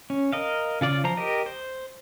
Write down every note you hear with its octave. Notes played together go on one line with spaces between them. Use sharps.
C#4
A#4 D#5 F5
C#3 F4 D5
F3 C5 A#5
G4 A#4 D#5
C5